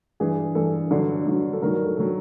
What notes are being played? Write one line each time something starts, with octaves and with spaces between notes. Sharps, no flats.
G2 E3 G#4
G2 E3 A4
G2 D3 F#3
G2 D3 F#3
A4
G2 D#3 F#3 A#4
A#4
A4
D#3 F#3 A4